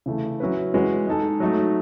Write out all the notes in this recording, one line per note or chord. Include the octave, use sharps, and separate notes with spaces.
C#3 E3 A3
F#3 C#4 E4 B4
E3 G#3 C#4 F#4 B4
G#3 D#4 A4
F#3 A3 D#4